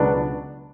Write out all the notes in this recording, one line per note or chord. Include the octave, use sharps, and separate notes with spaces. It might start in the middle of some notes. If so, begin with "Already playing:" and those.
Already playing: C#2 B2 F#3 B3 D4